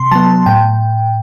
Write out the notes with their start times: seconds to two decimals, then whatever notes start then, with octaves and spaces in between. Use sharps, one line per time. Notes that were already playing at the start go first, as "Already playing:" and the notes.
Already playing: C3 C6
0.11 F#3 B3 A5
0.46 A2 G5